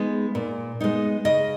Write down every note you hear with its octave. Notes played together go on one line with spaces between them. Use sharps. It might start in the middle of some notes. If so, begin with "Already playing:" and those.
Already playing: G#3 B3 D#4
A#2
G#3 B3 D#4
C#3 D#5